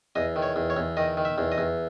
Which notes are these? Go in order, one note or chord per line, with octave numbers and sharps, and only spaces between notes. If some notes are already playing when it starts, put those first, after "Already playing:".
E2 D#5
D#3
C#5
E2
C#5
E2
D#3 D#5
D#3
E5
E2
D#5
E2